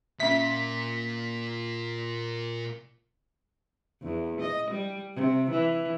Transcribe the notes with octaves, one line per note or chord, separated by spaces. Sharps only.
A#2 C#4 E5 B6
E2
D#5
G3
C3
E3